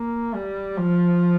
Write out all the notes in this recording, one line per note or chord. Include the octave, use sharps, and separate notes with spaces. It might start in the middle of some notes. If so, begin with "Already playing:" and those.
Already playing: A#3
G3
F3